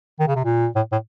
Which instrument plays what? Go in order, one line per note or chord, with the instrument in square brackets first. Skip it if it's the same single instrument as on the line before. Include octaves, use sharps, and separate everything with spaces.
[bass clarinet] D#3
C#3
C3
A#2
A2
A2